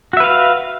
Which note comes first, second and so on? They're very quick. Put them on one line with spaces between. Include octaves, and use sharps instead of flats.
F#4 E5 B4 F5